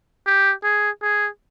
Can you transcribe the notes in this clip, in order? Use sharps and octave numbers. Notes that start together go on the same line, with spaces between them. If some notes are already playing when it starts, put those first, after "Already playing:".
G4
G#4
G#4